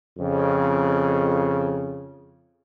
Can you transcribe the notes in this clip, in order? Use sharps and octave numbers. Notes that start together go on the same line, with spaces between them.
F2 C#3